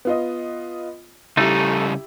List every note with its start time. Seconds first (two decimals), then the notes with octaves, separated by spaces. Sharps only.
0.05 B3 F4 D#5
1.37 C#3 G3 A3 D#4 E4 G4